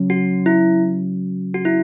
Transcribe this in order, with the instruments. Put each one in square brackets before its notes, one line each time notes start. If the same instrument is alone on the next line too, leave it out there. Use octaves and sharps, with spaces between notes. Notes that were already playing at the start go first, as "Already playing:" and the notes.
Already playing: [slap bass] C#3 F#3 C#4
[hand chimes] F#4
E4
F#4
E4